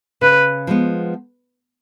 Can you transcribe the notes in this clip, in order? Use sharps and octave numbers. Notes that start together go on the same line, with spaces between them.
C#3 B4
F3 G#3 B3